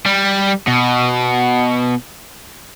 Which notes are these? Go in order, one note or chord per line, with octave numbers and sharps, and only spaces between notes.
G3
B2